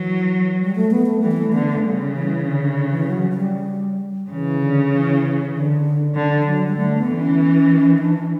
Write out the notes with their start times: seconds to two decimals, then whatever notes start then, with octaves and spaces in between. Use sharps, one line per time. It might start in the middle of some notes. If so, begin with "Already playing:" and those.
Already playing: E3 F#3
0.61 G3
0.76 A3
0.91 B3
1.06 A3
1.22 E3 G3
1.31 B3
1.37 A3
1.53 D3 B3
1.68 A3
1.83 C#3 G3
2.14 E3
2.45 D3
2.60 D3
2.75 D3
2.91 E3
3.07 F#3
3.31 F#3
3.37 G3
4.30 C#3 E3
4.61 D3
4.91 E3
5.53 D3
6.14 D3
6.42 E3
6.45 F#3
6.66 G3
6.76 D3 A3
6.97 B3
7.07 E3
7.17 C#4
7.99 D4